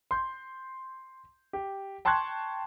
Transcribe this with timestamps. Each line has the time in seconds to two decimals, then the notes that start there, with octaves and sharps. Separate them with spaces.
0.11 C6 G6
1.53 G4
2.05 G5 A5 C6 C#6 F#6 G#6